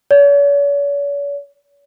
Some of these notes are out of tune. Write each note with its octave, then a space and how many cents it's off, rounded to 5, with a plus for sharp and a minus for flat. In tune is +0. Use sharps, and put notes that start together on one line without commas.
C#5 +45